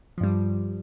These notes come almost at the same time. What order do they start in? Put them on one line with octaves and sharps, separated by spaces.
F3 G2 G3